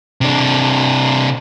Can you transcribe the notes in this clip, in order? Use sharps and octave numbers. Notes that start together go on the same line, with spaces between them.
C3 D4